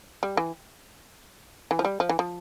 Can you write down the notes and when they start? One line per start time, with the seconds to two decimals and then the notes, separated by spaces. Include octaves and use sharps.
0.23 G3
0.37 E3
1.71 E3
1.79 F3
1.85 G3
2.00 F3
2.09 E3
2.19 F3